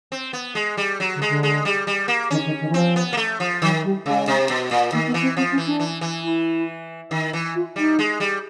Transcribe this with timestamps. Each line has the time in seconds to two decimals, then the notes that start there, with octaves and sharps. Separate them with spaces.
0.12 C4
0.33 B3
0.55 G#3
0.77 G3
1.00 F#3
1.15 D3
1.22 G#3
1.28 D3
1.43 G#3
1.65 G3
1.87 G3
2.08 A#3
2.31 D#3 C#4
2.45 D#3
2.60 D#3
2.69 E3
2.74 F3 C4
2.96 B3
3.13 A#3
3.17 A3
3.40 F3
3.61 D#3 F#3
3.83 G3
4.05 C#3 G#3
4.28 C3
4.49 B2
4.71 A#2
4.92 D#3 A#3
5.06 B3
5.14 E3
5.21 C4
5.37 F3 C4
5.51 C#4
5.58 E3
5.66 D4
5.80 E3
6.01 E3
6.23 E4
7.11 D#3
7.33 E3
7.55 F4
7.76 G3 D#4
7.99 G#3
8.20 G3